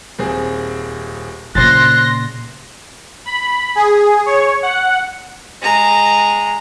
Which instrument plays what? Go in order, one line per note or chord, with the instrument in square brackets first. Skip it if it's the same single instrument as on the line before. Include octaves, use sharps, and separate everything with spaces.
[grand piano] D#1 C4 G#4
[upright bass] A#2 C#3 [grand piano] C5 A6 [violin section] C6 A#6 [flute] F#6
[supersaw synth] B5
G#4
C#5
F#5
[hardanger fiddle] G#3 A#5